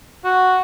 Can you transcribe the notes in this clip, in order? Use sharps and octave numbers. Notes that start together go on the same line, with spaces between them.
F#4